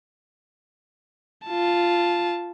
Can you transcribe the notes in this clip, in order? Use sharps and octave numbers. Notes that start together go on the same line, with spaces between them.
F4 A5